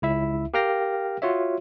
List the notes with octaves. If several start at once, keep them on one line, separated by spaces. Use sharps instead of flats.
C#2 E4 E5
G4 A#4 F5 G5 F6 A#6
F4 F#4 C#5 E5